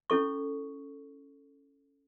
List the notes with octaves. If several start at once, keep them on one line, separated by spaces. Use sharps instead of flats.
C#4 E4 A4 C#6